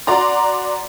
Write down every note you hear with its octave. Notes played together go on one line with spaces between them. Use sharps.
F#4 D5 A#5 C6